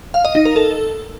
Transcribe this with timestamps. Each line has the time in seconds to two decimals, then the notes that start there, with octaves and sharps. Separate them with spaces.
0.14 F5
0.25 D#5
0.35 D#4
0.45 A#4
0.56 A4